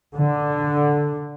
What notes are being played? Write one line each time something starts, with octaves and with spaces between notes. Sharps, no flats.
D3